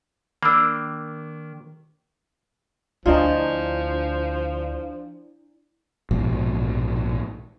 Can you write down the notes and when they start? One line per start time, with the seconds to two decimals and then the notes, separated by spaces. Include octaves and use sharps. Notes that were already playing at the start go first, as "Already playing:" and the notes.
0.43 D#3 A#3 D4 B5 E6
3.06 D2 F3 D4 E4 F4 D5 D#5
6.11 A#1 G#2 B2 F3